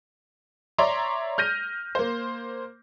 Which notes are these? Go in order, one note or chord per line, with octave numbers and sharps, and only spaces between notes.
C#5 D5 E5 A#5 C6
F6 G6 A#6 D#7
A#3 C5